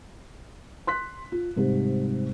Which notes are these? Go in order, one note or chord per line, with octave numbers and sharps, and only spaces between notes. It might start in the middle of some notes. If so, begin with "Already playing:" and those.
C6 F#6 B6
F4
G#2 C3 G3